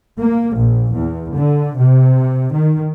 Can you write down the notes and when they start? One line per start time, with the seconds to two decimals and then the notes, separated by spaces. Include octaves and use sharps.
0.18 A#3
0.56 A#1
0.95 E2
1.35 D3
1.79 C3
2.54 D#3